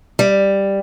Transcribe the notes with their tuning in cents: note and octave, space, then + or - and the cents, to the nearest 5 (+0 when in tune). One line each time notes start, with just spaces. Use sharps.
G3 +5